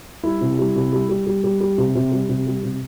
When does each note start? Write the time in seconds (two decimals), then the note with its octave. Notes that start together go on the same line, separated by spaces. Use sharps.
0.24 G3 E4
0.41 C3
0.59 G3
0.76 C3
0.93 G3
1.09 G3
1.27 G3
1.44 G3
1.61 G3
1.78 C3
1.95 C3
2.12 G3
2.29 C3
2.47 G3
2.63 C3